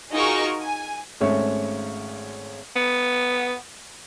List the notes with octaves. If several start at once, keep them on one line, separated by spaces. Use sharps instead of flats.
D#4 F4 F#4 G#4 A#4 C#6
G#5
G#1 G#3 A3 C#4 E5 C#6
B3